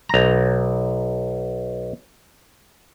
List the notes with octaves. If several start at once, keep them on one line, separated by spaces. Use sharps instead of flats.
B1 A#5